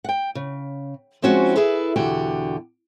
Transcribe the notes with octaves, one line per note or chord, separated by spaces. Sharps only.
F#5 G5
C#3
F3 G#3 C4 C#4 E4 F#4
E4 G#4 A4 B4
E2 B2 D3 F#4 G4